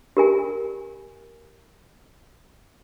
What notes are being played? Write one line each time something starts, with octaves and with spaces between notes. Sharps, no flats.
G4 A#4 G#5